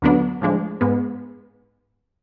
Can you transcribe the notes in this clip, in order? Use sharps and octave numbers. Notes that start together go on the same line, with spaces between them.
D2 D3 F#3 B3 D4
A2 F3 G#3 D4
G#2 G#3 B3